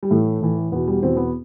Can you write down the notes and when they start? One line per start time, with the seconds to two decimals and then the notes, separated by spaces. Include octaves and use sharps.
0.03 G3
0.10 A2 E3 A3
0.41 A2 E3
0.72 E2 B2 B3
0.88 G3
1.03 E2 B2 C4
1.16 B3